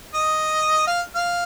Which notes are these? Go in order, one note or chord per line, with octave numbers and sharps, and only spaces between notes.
D#5
F5
F5